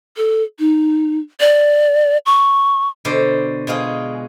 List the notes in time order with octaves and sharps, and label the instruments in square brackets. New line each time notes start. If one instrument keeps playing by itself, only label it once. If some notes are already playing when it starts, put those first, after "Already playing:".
[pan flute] A4
D#4
D5
C#6
[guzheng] B2 D3 C5 D5
B2 G#3 F4 G#4